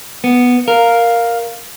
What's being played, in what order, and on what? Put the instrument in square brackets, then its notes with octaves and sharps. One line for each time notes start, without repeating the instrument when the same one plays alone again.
[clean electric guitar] B3
[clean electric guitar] A#4 [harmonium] F5